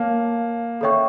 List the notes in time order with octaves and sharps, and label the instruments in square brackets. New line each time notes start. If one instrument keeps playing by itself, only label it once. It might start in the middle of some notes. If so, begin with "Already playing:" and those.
Already playing: [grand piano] A#3 [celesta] C#5 F5 A5
[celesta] A4 C#5 E5 G5 C#6